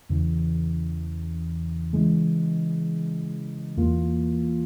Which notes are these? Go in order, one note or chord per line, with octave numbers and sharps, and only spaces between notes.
E2 C#3 E3
C#3 E3 G#3
E2 E3 A#3 F4